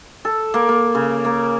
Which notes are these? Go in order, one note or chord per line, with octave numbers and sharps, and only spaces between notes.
A4
A#3
A#3
C#3
A#3